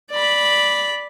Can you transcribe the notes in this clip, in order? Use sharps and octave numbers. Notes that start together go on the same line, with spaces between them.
D5 B5